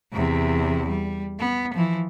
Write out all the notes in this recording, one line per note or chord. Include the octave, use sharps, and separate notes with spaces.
E2 C3
G3
B3
E3 F3